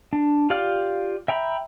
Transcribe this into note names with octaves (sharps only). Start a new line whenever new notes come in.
D4
F4 G4 D5 F5 F6
E5 G5 A#5 B5